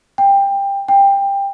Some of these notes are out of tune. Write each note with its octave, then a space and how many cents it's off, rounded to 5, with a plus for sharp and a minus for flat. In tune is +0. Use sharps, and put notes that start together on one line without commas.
G5 +20
G5 +20